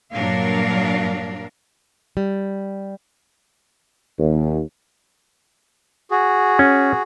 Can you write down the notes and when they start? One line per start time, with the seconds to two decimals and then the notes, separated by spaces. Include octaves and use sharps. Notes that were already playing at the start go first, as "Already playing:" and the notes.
0.13 G2 A#2 F#3 D4 A#4 F5
2.17 G3
4.19 D#2
6.11 F#4 G#4
6.59 C#4